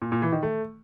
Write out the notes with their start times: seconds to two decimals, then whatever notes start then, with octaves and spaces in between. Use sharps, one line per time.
0.02 A#2
0.12 A#2
0.22 E3
0.32 D#3
0.43 A3